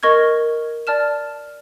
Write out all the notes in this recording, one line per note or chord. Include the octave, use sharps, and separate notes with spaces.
A#4 D#5 C#6 F6 G#6
D5 A5 F6 E7